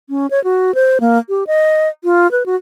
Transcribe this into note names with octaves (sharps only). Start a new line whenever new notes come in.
C#4
C#5
F#4
C5
A#3
G4
D#5
F4
B4
F#4